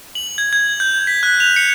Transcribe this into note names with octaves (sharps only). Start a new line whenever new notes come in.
F#7
G#6
G#6
G6
B6
F#6
F7
C#7